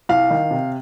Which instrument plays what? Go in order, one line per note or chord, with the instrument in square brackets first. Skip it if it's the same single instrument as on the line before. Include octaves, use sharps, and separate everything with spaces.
[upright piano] C2 F5
D#3
C3